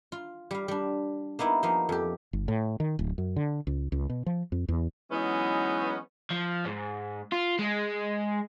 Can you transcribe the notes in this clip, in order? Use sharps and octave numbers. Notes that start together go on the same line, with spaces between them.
F4
G3 F5
G3 D4
A#3 B3 D#4 E4
F3 A#3 B3 D#4
F2 G4
G1
A2
D#3
D1
F#2
D3
C#2
C#2
B2
F3
F2
E2
E3 F#3 G#3 B3 C#4 D#4
F3
G#2
F4
G#3